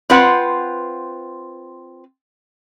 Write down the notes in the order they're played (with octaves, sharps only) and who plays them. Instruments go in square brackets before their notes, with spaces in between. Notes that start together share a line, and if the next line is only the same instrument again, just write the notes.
[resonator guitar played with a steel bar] C4 F4 B4 F#5